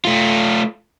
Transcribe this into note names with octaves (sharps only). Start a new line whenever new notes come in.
A3 F4